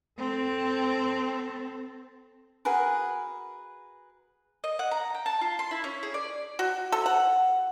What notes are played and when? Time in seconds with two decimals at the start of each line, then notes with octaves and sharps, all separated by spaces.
0.18 C4 A4
2.65 F#4 G#4 A#4 B4
4.64 D#5
4.79 F#5
4.91 A#5
5.14 G5
5.26 A5
5.41 F4
5.59 C6
5.71 E4
5.84 C#4
6.03 G#4
6.14 D5
6.59 F#4
6.92 A4
7.06 F#5